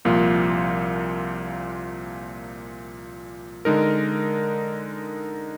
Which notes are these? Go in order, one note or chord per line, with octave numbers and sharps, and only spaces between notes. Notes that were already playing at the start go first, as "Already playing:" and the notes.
C2 A#2 F3 A#3 F4
D3 G#3 D#4 A#4